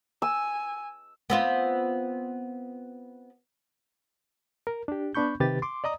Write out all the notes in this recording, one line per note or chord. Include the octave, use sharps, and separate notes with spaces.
G#5 E6
B3 C4 F4
A#4
D4 G4
B3 D4 B5 C#6 G6
C3 D#3 G4 B4 A6
C6 D6
D5 D#5 A#5 D#6